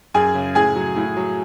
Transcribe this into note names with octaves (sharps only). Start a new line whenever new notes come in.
F#2 G#4 G#5
C#3
A2 G#4 G#5
F#3
A2
F#3